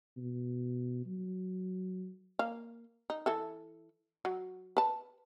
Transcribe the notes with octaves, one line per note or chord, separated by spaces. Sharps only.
B2
F#3
A#3 F5
D#4
E3 A4 E5
F#3
B4 A5